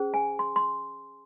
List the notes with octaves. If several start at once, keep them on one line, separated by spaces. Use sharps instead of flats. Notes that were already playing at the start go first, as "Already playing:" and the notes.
Already playing: C#4 G#4 C5
G#5
C6
C6